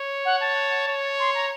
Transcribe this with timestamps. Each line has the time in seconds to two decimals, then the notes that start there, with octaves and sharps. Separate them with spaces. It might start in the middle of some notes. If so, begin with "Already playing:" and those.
Already playing: C#5
0.25 F#5
0.40 A5
0.88 C#5
1.19 C6
1.35 A#5